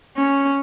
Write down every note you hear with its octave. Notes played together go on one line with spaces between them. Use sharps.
C#4